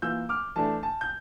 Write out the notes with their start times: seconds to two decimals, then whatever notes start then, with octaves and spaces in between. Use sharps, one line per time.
0.02 E3 A#3 F4 E6 G6
0.29 D6 F6
0.56 E3 A3 D4 A5
0.83 A5
1.01 G6